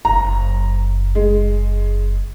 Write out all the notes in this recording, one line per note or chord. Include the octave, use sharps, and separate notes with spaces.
F#1 E4 A#5
G#3